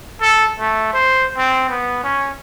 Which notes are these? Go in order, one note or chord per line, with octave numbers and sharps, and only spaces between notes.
A4
A3
C5
C4
B3
C#4